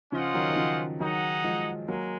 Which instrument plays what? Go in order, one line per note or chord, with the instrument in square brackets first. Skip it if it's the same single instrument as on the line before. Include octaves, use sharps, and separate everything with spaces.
[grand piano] C#3 F3 [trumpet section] C#4 F4 C5 D#5 F#5
[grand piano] D#3 F#3
D#3
C#3 F3
[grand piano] D#3 F#3 [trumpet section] D#4 G#4 D#5 F#5
[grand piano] F3 G#3
[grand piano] F#3 A#3 [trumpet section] G#3